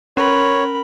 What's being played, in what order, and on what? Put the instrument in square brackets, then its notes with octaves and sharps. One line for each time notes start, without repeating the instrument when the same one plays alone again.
[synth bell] C#4 [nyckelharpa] A#4 B5 [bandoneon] C#5